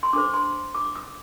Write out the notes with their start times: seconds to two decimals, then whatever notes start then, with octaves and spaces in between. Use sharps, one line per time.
0.03 C6
0.13 D4 A4 C5 D6
0.34 C6
0.75 D6
0.96 D#6